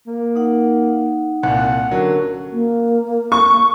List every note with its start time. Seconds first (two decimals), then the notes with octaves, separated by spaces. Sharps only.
0.07 A#3
0.36 D#4 F#5
1.43 C2 A#2 F#5
1.91 D3 F#3 C#4 F#4 A#4
2.52 A#3
3.32 C#6